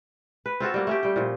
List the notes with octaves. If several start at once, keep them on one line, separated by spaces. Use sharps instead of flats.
B4
C4 F4 F#4 A4
G3 A#3 F#4
A3 C#4 G4
G3 G5
A#2 F3